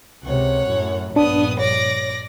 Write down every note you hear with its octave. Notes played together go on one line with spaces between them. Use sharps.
C#2 C3 C#5 F#5
F#2 A2
A#1 G2 B3 D4 D#6
C#5 D5 A#6